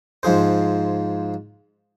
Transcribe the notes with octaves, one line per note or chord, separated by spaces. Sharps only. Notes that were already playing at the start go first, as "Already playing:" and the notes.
G#2 F3 G#4 C5